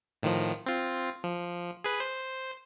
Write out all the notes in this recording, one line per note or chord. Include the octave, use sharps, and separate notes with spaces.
A2 D#3 F3
C4 F4
F3
G#4 B4
C5